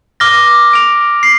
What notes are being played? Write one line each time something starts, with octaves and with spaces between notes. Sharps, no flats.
D6 F6 A#6 G7
F6 D7 F7
C7